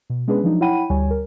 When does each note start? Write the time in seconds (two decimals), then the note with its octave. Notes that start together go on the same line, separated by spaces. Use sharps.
0.10 B2
0.28 G#3 B3 C#4 D4 G#4 B4
0.44 F3 F#3 D4 D#4
0.61 E4 C#5 F#5 G5 B5 D#7
0.90 D2 G3 C#5 G#5
1.11 A#4